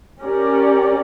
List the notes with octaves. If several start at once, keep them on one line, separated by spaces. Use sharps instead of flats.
C#4 G4 A#4 D5